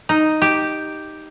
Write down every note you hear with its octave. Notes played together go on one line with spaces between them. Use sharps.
D#4
G4